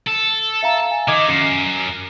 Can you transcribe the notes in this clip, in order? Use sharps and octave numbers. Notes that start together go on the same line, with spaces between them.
A4
E5 F5 A#5
G#5
D#3 D#5 D6 G#6
F#2 C7 C#7 E7